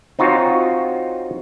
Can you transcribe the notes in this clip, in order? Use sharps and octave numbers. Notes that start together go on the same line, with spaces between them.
C4 D#4 F4 F#4 C#5